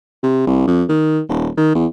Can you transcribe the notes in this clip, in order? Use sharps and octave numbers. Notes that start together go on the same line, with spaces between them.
C3
C2
F2
D#3
D#1
D#3
E2